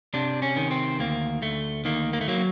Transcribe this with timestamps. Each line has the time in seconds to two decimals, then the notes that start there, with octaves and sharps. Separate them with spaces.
0.14 C3 D4
0.42 C#4
0.56 D#3
0.71 C4
0.99 D2 A#3
1.42 D2 A3
1.85 D#3 A#3
2.13 A#3
2.21 A3
2.28 F#3 A#3